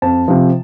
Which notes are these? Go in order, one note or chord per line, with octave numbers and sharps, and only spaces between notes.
F2 A5
C3 F3